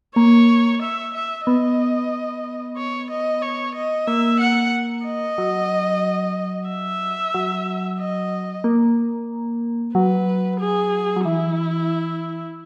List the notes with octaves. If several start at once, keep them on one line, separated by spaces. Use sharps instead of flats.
A#3 C#5
E5
E5
B3 D#5
C#5
D#5
C#5
D#5
A#3 E5
F#5
D#5
F#3
E5
F#3
D#5
A#3
F#3 B4
G#4
F#3
E3 E4